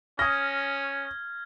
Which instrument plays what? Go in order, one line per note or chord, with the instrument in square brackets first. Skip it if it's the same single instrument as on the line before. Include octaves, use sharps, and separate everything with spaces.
[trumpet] C#4 [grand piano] D#6 A#6 [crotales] F6 G#6